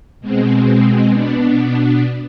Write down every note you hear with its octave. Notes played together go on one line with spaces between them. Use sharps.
B2 G#3 C4
B2 B3 D4